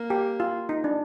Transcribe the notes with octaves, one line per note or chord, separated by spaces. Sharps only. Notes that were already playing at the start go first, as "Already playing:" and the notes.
Already playing: A#3
G4
F4
D#4
D4